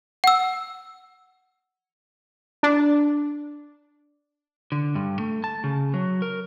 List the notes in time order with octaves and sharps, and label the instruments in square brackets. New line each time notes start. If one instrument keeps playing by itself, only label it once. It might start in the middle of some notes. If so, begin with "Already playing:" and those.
[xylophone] F#5 E6
[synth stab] D4
[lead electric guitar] D3
G2
A3
A5
C#3
F#3
A#4